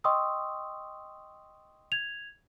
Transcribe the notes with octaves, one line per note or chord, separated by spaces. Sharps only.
D#5 G5 C6 C#6 D#6 E6
G#6 F7